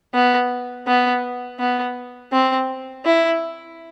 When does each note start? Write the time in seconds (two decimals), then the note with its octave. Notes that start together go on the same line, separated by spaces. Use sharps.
0.14 B3
0.87 B3
1.59 B3
2.32 C4
3.05 E4